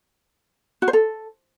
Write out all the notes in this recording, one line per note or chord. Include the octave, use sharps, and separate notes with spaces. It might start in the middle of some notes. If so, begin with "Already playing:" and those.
F#4
C5
A4